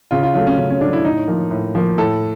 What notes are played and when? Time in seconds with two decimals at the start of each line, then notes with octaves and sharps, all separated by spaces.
0.11 C#3 F4
0.23 F4
0.34 F#3 A3 F4
0.47 C#4
0.58 C#3 C#4
0.70 C#4
0.81 F#3 A3 D4
0.93 E4
1.05 A2 D#4
1.28 F3 A#3
1.51 A2
1.75 F3 A#3
1.98 A2 A4